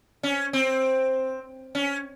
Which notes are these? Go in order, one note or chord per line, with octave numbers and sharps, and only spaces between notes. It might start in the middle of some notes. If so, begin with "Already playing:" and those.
C#4
C4
C#4